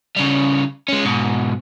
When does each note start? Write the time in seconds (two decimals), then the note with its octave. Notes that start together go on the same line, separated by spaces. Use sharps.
0.16 C#3 G3
0.88 G#3 C#4
1.05 G#2 B2